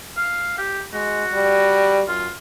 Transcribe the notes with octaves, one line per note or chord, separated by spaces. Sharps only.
F5
G4
G#3 F#4
G3
F#2 F4